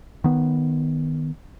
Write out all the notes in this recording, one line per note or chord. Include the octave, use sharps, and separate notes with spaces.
D#3 B3